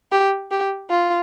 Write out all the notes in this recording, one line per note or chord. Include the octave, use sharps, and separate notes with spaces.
G4
G4
F4